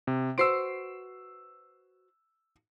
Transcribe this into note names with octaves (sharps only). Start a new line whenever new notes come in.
C3
F#4 B4 C5 E6 C7 D7